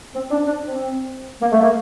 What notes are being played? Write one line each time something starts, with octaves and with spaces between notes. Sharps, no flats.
C4
D4
D4
C4
A#3
A3
A#3